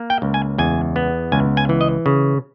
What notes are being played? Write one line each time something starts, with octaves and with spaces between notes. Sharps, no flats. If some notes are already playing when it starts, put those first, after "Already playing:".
Already playing: A#3
G5
C#2
G#5
E2 G#5
B3
C#2 G#5
G#5
E3
D#5
C#3